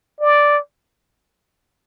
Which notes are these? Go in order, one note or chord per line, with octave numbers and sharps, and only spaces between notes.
D5